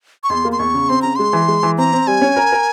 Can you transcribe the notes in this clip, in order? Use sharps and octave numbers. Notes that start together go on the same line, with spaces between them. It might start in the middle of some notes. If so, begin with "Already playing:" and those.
C#6
E2 C6
A#3
C6
E2 C#6
C#3
C4 C6
C#3 A#5
G#3 C6
E3
G#3
E3
C4 A#5
C4
G3 G#5
C#4
A#4
A#4